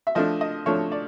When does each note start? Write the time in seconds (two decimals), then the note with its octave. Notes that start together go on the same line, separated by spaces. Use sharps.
0.07 E5
0.15 F3 A3 D4 D#5
0.41 D#5
0.66 F3 A3 D4 C#5
0.92 D5